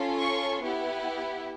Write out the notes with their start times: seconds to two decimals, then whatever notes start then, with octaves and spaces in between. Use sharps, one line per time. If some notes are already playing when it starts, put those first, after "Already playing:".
Already playing: C#4 F4 A4
0.20 C#6
0.62 B3 E4 G4